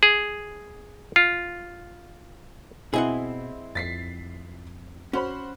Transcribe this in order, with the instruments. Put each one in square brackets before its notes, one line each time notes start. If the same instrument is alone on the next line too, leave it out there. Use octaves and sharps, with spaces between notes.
[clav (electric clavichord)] G#4
F4
[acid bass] B2 [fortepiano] C4 E4 [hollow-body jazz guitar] G#4 D#5 F#5
[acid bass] F2 [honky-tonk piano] A6 B6 C7
[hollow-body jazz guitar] C#4 [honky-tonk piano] F#4 C5 B5